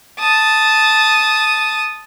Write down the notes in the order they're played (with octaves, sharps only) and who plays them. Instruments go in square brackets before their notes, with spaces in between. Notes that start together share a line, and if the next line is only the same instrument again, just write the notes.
[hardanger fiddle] A5 D#6